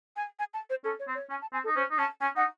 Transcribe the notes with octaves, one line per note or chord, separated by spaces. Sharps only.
G#5
G#5
A5
C5
C#4 A4
C#5
C4
C#5
C#4 G#5
A5
C4 G#5
A4
D#4
C#4 C5
D#4
C#4 A5
C#4 G#5
D#4 F#5